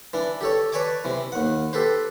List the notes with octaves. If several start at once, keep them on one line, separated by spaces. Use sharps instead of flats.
E3 D4
G4 A4 C#5
B4 C#5 D5 G#5 A5 D6
C3 E3
D#2 F#5
G4 A4 B4 C5